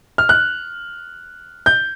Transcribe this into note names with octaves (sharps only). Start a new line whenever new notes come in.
F6
F#6
G6